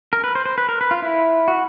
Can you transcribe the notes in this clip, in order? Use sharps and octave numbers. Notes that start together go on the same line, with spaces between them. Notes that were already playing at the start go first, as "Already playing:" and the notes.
A#4
B4
C5
C5
B4
A#4
B4
F4
E4
F#4